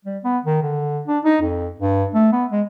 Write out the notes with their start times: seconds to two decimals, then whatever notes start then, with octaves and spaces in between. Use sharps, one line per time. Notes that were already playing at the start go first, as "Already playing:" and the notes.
0.05 G3
0.24 B3
0.44 D#3
0.63 D3
1.07 D4
1.25 D#4
1.42 F2
1.80 G2
2.14 A3
2.33 B3
2.52 G#3